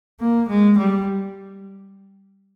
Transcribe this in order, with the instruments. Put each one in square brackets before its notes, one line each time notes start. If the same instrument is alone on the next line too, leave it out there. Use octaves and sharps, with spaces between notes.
[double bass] A#3
G#3
G3